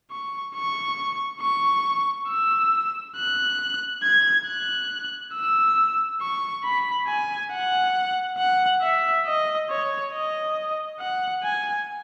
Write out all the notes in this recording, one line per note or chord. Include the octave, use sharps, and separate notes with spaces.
C#6
C#6
C#6
E6
F#6
G#6
F#6
E6
C#6
B5
G#5
F#5
F#5
E5
D#5
C#5
D#5
F#5
G#5